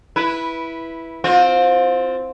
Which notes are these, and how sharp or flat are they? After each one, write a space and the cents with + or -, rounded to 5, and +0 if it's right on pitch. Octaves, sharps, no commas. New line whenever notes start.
E4 +0 B4 -10
C4 +0 F4 +30